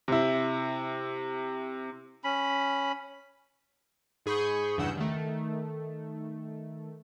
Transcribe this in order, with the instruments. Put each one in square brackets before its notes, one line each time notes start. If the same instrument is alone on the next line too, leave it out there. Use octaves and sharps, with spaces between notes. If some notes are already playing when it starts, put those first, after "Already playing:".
[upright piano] C3 E4
[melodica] C#4 B5
[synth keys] G#2 G#4 B5 C#6 G6 D#7
E2 G2 C#3 F#5 E6 G6
D#3 A3